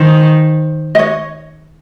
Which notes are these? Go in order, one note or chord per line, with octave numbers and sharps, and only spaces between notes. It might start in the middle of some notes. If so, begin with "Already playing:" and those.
Already playing: D#3 C5
D#5
C#5